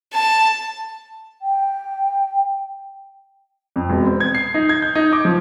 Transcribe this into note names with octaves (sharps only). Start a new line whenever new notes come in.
A5
G5
F2
E1
C4
G#6
C7
D#4
G#6
G6
D#4
D6
F3